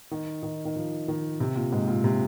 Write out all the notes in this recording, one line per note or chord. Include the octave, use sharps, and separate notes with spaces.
D#3
D#3
D#3
F3
D#3
C3
A#2
G#2
A#2
C3